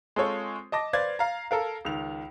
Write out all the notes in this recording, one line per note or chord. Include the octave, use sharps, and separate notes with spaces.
G#3 C4 F4 A4 C5 C#5
D#5 A5 D6 A#6
B4 C5 D5 F5 G#6 A6
F5 A#5
A4 A#4 F5
C#2 D#3 F7